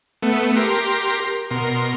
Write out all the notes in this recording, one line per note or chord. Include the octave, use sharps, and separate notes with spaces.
A3 B3
G4 A#4 C6
B2 A#4 C6